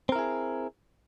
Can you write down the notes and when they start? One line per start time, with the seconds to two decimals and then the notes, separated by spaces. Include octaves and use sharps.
0.09 C4
0.12 A#4
0.15 E4
0.19 G#4